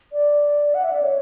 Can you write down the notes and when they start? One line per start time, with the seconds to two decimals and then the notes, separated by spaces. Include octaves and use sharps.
0.12 D5
0.74 F#5
0.84 E5
0.93 D5
1.03 C#5